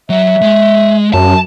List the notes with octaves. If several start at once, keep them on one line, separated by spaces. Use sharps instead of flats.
F#3 E5
G#3
F#2 A5